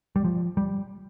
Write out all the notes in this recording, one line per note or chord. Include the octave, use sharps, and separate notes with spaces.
G3
F3
G3